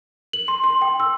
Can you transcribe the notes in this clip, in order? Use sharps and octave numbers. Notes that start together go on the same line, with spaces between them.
F#7
C6
C6
G5
E6